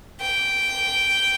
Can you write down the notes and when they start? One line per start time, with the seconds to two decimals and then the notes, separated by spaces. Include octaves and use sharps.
0.20 G5